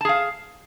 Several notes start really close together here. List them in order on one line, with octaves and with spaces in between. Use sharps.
A5 G#4 F5